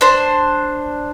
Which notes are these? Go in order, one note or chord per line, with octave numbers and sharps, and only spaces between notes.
D4 C5